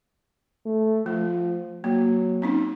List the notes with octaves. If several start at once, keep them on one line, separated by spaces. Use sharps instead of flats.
A3
F3 A3
F#3 A#3
C4 C#4 D#4